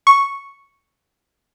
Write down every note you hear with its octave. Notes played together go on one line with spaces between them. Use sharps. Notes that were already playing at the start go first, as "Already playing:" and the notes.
C#6